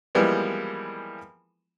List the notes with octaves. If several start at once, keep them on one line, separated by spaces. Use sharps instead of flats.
E3 F3 G3 G#3 A#3 B3